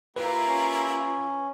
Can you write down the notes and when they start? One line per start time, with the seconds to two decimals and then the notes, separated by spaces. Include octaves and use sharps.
0.16 A#3 E4 F4 G4 B4 A#5
0.47 C#4